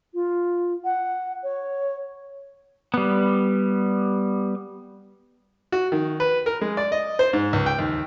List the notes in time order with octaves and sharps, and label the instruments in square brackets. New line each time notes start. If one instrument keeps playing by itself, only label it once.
[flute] F4
F#5
C#5
[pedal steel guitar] G3 B3
[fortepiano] F#4
D#3
B4
A#4
G#3
D5
D#5
C5
G#2
C#2
G5
D#2